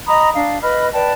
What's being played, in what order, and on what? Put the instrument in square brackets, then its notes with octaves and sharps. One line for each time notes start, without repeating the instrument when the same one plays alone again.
[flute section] D#5 A#5 B5 D#6
D4 F5
B4 D#5 B5 F6
B4 D5 G5 A5